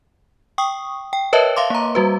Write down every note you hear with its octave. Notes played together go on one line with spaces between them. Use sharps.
G5 C#6 D#6
G5
A#4 B4 C#5 D#5 E5 A5
E5 F5 C6 D6
A#3 A#5
G3 F#4 B4